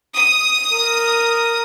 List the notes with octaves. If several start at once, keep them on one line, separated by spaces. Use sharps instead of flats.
D#6
A#4